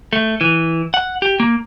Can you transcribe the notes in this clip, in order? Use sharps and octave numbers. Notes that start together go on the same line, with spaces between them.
A3
E3
F#5
G4
A#3